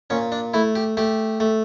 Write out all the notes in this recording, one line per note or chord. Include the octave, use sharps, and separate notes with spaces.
A#2 C#4
D4
A3 E4
G4
A3 G4
A3